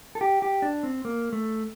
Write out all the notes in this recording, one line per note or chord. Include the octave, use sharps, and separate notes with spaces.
A4
G4
G4
D4
C4
A#3
A3